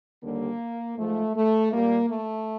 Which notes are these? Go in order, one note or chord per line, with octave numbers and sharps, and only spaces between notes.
D#2 D3 G3 A#3
G#2 F3 G#3 A3
A3
A#2 G3 A#3
A3